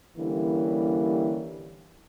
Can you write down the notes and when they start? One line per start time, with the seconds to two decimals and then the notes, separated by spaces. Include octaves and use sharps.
0.18 D3 E3 G3 A#3 C#4